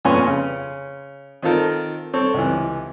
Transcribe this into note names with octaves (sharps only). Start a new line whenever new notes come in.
F2 A#2 B3 C#4 G#5 C6
C#3
D#3 C4 F4 A4 A#4
C4 A4 C#5
C#2 C3 E3